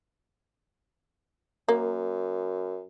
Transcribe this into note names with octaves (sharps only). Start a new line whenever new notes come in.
F#2 A#3